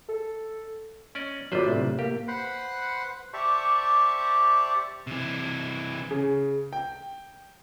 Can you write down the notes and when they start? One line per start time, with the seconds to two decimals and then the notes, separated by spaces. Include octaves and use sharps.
0.08 A4
1.15 C#4 D5 D#5
1.52 G1 F#3 B4 C5 D5
1.66 A2 C3 A3
1.99 A#3 G4
2.28 B4 C5 F#5 B5 C6
3.34 G4 C5 D5 E5 A5 C#6
5.07 C3 E3
6.11 C#3
6.73 G5